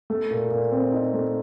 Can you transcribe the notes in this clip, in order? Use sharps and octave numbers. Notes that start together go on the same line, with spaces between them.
A3
A#2
A#2
C4
D#4
A3